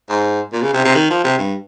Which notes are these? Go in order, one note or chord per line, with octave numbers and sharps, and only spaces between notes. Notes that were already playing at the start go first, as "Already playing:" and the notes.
G#2
A#2
C#3
C3
C3
D#3
F3
C3
G2